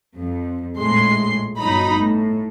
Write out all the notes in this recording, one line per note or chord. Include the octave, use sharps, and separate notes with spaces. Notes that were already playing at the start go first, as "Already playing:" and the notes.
F2
A#1 A2 G#3 C6
G1 F#3 D#4 A#5 B5
A2